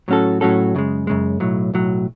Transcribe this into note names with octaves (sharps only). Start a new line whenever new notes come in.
A2 F#3 C#4 F#4 A4
A2 F#3 C#4 F#4 A4
F#2 C#3 G#3
F#2 C#3 G#3
B1 A2 F#3
B1 A2 F#3